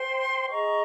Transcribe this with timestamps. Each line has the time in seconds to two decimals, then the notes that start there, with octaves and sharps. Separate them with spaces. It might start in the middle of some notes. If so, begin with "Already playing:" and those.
Already playing: C5 G5 C6
0.50 G#4 D#5 A#5 C#6